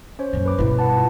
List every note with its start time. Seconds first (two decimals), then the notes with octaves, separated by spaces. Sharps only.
0.19 C#4 C5 C#5
0.33 F#2 A#2
0.46 B4 D6
0.58 G2 B2 E4 B4
0.79 B4 F#5 A5
0.93 E4 F4